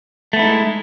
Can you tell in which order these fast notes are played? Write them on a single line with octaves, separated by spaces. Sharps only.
A3 B3 E4 D#4 G#3